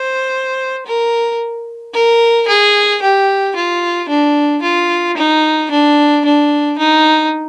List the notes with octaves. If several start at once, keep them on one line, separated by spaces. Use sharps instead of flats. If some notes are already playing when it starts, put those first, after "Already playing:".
Already playing: C5
A#4
A#4
G#4
G4
F4
D4
F4
D#4
D4
D4
D#4